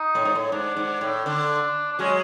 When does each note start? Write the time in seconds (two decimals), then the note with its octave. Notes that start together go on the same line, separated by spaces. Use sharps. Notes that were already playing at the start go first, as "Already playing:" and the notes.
Already playing: D#4
0.15 A2
0.25 G#2
0.35 A2
0.52 G#2 D4
0.76 G#2
1.01 A2
1.25 D3 D4
1.92 D4
1.99 F#3 G#3 C#4